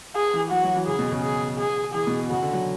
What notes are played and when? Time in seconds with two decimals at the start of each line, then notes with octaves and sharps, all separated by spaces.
0.16 G#4
0.34 E3
0.51 F#3 F#4
0.64 F#3
0.75 E3
0.87 C#3 G#4
0.99 B2
1.12 C#3
1.23 G#4
1.59 G#4
1.94 E3 G#4
2.07 B2
2.30 C#3 F#4
2.42 D3
2.53 F#3